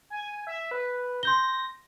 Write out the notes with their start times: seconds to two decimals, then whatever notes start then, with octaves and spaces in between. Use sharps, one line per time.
0.10 G#5
0.47 E5
0.71 B4
1.23 C6 G6 A#6 G7